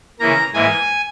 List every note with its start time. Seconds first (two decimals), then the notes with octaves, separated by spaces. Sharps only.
0.20 C#3 E3 A#3 A#5
0.54 G#2 E3 A#3 G#5